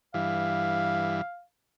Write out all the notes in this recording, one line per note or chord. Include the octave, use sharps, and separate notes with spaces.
G2 E3 F5